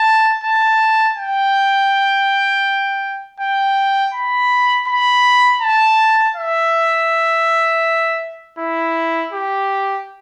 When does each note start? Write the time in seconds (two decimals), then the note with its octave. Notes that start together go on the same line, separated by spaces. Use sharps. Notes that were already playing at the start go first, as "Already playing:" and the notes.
Already playing: A5
0.43 A5
1.17 G5
3.40 G5
4.14 B5
4.88 B5
5.62 A5
6.37 E5
8.59 E4
9.33 G4